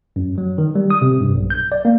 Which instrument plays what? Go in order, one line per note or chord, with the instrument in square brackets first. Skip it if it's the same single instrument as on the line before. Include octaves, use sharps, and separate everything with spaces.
[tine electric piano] F#2
F#3
D#3
G3
D#6
C3
G2
B1
G6
D5
A#3